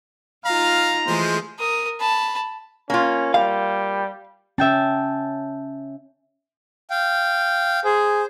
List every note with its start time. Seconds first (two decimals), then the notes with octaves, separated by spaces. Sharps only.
0.45 D#4 F4 F5 A#5
1.07 E3 F3 G#3 A3 G#4 C5
1.58 A#4 D#6
2.00 A5 B5
2.90 A#3 C#4 F4
3.34 G3 F5
4.58 C#4 E5 G5 A5
6.90 F5 G5
7.85 G#4 C5